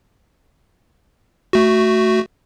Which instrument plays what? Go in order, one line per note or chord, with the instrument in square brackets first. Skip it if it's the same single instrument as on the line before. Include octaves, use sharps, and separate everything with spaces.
[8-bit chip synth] A3 F#4